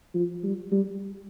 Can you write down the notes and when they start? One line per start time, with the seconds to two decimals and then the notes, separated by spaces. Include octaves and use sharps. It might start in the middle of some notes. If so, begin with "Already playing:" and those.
0.14 F3
0.43 G3
0.72 G3